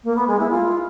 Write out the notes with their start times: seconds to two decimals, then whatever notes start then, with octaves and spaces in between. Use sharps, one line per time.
0.04 A#3
0.16 B3
0.27 G#3
0.39 E4
0.51 F4